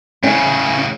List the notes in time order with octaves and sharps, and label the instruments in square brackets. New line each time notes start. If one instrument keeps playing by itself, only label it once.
[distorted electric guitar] A2 C#3 [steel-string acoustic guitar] C#4 E5